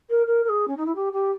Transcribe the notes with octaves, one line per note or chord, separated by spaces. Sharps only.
A#4
A#4
A#4
G#4
C#4
D#4
E4
G4
G4